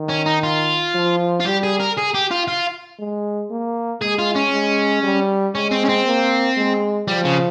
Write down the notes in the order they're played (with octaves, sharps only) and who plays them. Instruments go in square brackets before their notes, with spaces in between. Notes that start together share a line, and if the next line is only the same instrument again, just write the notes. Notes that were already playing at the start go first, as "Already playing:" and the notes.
Already playing: [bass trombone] D#3
[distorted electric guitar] C#4
D#4
F4
[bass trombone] F3
[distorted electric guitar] F4
[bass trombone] G3 [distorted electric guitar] G4
[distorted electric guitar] G#4
A#4
G#4
G4
F4
F4
[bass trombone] G#3
A#3
[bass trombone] G#3 [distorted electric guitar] G#4
[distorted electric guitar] F4
C#4
[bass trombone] G#3
G3
[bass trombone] G#3 [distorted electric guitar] C#4
[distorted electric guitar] C4
C#4
C4
[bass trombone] A#3
G#3
[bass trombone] F3 [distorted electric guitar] G3
[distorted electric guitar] C#3